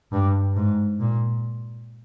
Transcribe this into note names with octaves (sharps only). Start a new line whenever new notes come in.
G2
G#2
A#2